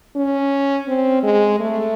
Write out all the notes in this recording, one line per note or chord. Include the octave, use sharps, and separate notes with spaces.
C#4
C4
G#3
A3